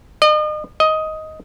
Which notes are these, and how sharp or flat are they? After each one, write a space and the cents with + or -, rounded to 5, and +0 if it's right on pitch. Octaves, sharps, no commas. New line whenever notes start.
D#5 -40
D#5 +10